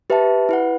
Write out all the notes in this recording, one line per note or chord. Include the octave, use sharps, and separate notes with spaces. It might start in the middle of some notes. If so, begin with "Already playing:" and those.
G4 B4 E5 A5
E4 B4 F#5